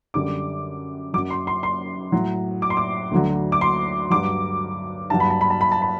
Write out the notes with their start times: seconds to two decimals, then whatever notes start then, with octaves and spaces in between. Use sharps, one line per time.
0.14 F#2 D3 G3 D6
1.13 F#3 D6
1.17 F#2
1.30 C6
1.47 C6
1.63 C6
2.12 A2 F#3
2.62 D6
2.70 C6
2.77 D6
3.11 D2 D3 F#3
3.52 D6
3.61 C6
4.10 G2 F#3 D6
5.10 G2 F#3 A5
5.20 B5
5.30 A5
5.41 B5
5.50 A5
5.61 B5
5.72 A5
5.82 B5